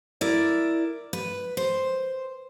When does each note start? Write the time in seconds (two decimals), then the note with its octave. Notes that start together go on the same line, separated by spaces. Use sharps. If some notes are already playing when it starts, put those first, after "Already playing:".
0.21 E4 A#4 D5
1.13 B4
1.57 C5